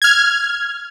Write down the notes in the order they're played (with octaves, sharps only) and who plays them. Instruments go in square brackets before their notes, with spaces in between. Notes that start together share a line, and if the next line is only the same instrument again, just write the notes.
[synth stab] F6 G#6